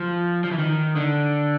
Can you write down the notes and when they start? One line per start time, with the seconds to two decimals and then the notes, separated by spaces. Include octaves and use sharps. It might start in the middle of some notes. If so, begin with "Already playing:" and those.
Already playing: F3
0.44 F3
0.51 E3
0.58 D#3
0.96 D3